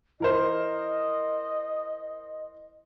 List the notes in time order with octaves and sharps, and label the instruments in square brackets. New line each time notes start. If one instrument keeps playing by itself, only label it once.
[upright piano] E3 A#4 C5 [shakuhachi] D#5